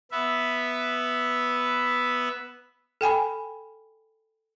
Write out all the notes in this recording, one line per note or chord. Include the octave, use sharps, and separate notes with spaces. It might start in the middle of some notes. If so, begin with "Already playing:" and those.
B3 B4 E5
A4 G5 G#5 B5